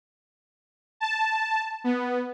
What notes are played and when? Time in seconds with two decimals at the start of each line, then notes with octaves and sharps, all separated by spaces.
1.00 A5
1.84 B3